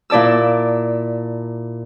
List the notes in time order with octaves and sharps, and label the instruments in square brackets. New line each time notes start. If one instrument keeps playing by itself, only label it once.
[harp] A#2 E4 D5 A5 E6